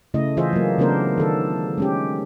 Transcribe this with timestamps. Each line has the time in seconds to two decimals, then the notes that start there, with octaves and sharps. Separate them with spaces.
0.14 C#3 A3 E4 D#5
0.37 E3 F4 G#4 C5 D#5 E5
0.53 F#3 A#3
0.78 C#3 A3 B3 D4 A#4 C5
1.18 D#3 A4
1.78 G#3 C#4 G4